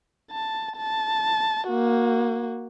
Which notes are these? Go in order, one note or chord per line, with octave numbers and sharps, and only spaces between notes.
A5
A5
A#3 F#4